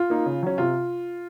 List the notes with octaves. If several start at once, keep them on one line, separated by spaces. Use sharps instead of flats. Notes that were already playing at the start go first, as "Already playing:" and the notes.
Already playing: F4
A#3 D#4
C#3
F#3 C#4
C3 F4